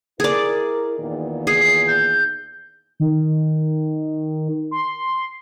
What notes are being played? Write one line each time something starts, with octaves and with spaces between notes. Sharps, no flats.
E4 G#4 A#4 D5
E2 A#2 D#3
G#4 C7
G6
D#3
C6